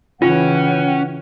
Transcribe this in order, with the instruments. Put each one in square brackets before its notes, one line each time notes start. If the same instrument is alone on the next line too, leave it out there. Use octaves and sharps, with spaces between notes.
[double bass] C#3 E3 [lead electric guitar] C#4 [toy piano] F4 [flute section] F#5 G5